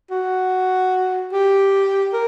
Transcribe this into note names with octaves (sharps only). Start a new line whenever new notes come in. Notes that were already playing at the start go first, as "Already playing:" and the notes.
F#4
G4
A#4